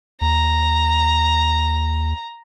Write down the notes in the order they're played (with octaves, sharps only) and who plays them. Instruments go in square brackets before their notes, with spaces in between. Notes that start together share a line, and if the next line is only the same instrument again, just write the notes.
[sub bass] D#2 [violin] A#5